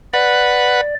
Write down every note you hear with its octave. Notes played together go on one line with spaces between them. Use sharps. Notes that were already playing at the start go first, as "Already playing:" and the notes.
B4 D5 F#5